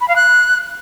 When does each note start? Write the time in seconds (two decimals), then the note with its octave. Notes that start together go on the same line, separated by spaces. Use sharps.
0.01 B5
0.08 F5
0.16 F#6